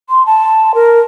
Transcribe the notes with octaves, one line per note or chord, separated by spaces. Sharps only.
C6
A5
A#4